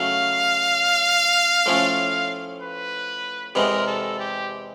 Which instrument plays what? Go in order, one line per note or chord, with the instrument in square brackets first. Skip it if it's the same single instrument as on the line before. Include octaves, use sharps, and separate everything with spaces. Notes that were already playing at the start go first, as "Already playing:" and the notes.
Already playing: [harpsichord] C#3 F#3 A3 [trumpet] F5
[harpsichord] A2 F3 A3 C#4
[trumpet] B4
[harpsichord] E2 C3 E3 G#3 B3 [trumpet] A#4
[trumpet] A4
G4